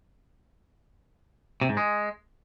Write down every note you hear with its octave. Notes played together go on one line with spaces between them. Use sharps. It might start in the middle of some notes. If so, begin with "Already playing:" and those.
C3
G#2
G#3